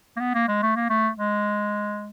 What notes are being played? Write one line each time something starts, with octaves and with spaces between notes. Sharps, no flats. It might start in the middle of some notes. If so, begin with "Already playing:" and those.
A#3
B3
A#3
G#3
A3
A#3
A3
G#3